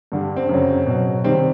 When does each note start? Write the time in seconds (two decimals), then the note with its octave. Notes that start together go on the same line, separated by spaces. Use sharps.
0.12 G2 D3 G3
0.36 C4
0.49 F#2 C#3 F#3
0.86 B2 F#3
1.24 C3 D#3 G3 C4